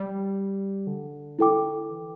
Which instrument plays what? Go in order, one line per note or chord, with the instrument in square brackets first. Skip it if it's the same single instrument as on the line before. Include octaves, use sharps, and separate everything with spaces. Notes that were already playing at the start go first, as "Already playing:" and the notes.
Already playing: [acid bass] G3
D3
[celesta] E4 A4 G5 D6
[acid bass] E3